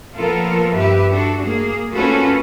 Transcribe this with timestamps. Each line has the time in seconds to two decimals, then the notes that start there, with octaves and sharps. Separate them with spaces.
0.16 A#2 F3 B3 F4 A4 A#4
0.74 G2 G4 B4 E5
1.11 D4 F#4 A4
1.42 A#3 G#4
1.94 A#3 C#4 F4 F#4 A4 B4